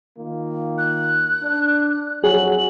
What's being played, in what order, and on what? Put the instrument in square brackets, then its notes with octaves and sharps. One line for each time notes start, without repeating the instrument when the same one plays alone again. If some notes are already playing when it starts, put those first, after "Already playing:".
[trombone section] D#3 A#3 F4
[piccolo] F#6
[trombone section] D4
[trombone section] F2 F#3 [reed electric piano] G#4 [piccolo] F#7